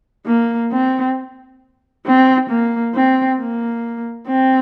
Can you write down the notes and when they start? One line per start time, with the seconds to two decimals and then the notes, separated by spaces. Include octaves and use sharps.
0.27 A#3
0.72 C4
2.06 C4
2.50 A#3
2.95 C4
3.39 A#3
4.29 C4